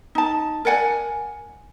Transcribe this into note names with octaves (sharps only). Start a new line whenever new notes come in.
D#4 A5
A#4 D5 F#5 G#5